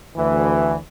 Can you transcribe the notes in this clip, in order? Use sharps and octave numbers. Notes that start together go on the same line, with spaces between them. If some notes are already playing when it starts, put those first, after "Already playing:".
D2 E3